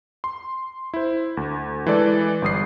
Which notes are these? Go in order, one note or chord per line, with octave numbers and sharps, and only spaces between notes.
C6
E4 C5
D2
E3 G#3 A4 D5
G1 G3 D#6 C7